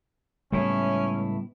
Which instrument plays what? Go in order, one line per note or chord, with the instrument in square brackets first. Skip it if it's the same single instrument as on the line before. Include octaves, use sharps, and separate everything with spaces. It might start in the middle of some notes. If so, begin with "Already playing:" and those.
[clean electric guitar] C#2 A2 E4 [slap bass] G3 B3 [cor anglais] C#4